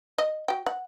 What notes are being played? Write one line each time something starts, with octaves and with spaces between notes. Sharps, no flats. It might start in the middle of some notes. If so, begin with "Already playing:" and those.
D#5
F#4 G5
F#5